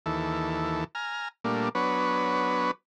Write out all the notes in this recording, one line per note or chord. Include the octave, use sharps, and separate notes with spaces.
D#2 E3 A4
G#5 A#5 F6
A#2 G3 A3 A#3 D4
F#3 B3 D4 B4 C#5